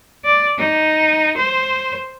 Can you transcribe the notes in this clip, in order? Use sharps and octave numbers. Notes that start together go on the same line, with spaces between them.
D5
D#4
C5